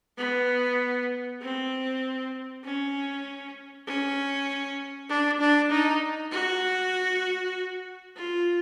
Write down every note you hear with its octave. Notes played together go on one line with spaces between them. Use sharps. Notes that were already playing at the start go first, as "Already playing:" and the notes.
B3
C4
C#4
C#4
D4
D4
D#4
F#4
F4